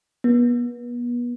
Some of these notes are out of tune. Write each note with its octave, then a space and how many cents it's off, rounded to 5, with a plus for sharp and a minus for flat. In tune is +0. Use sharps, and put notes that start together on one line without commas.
B3 -35